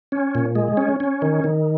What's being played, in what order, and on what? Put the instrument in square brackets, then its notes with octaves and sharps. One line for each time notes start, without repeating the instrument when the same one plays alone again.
[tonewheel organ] C#4
A#2
G#3
C#4
C#4
D#3
D#3